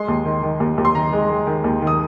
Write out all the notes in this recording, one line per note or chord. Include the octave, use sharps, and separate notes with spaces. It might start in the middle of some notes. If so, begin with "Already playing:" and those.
Already playing: G#3 C6
D#2
D#3
D#3
D#2
D#2
C6
D#3 A#5
G#3
G#3
D#3
D#2
D#3
D#6